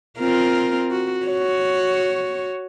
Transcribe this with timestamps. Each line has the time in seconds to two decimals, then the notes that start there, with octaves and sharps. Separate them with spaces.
0.19 C4 F4 A#4
0.91 F#4
1.26 F#4 C#5